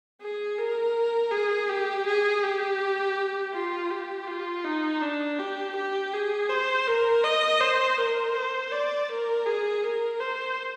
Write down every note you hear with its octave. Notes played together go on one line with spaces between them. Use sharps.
G#4
A#4
G#4
G4
G#4
G4
F4
G4
F4
D#4
D4
G4
G4
G#4
C5
A#4
D#5
C5
A#4
C5
D5
A#4
G#4
A#4
C5